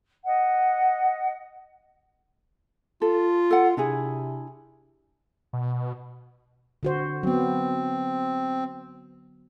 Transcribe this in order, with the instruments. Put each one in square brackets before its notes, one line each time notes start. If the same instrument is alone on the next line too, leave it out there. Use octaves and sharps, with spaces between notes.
[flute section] D#5 F#5
[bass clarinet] F4 [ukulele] A4
[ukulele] A4 F#5
[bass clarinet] C3 [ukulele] D4 E4 G#4
[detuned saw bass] B2
[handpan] D3 F#4 C5
[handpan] F#3 B3 [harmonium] C4